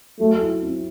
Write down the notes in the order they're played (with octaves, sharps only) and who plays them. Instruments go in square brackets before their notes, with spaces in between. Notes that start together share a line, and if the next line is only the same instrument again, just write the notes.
[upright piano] F#3 [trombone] A3
[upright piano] E4
C4